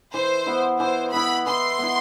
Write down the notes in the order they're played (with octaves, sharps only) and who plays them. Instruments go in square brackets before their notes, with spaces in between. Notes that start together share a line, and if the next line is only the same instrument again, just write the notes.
[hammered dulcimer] E3 [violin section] C5
[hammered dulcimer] B3 E4
[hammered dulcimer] E3 [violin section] C5
[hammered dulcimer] B3 E4 [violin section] B5
[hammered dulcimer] E3 [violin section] C6
[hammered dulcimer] B3 E4